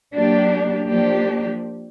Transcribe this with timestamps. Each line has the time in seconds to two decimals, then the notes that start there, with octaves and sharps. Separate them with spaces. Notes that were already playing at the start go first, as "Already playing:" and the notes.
0.15 F#3 A#3 D4 G4
0.87 F3 A#3 D4 G4